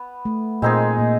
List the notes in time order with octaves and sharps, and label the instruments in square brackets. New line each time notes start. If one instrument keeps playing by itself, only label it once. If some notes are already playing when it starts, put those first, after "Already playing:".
Already playing: [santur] B3 B4
[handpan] A3
[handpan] A#2 A#3 [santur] G#3 C4 D#4 G#4
[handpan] A#2 A#3